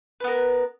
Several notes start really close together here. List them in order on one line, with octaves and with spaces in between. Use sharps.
B4 B3 A#4